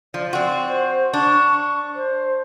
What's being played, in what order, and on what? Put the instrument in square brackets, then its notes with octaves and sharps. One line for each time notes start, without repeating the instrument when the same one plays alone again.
[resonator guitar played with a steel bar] F3 [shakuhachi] D5
[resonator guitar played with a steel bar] C4 F#4 [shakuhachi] D5
[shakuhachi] C5
[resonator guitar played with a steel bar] D4 [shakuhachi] C#6
[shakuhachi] C5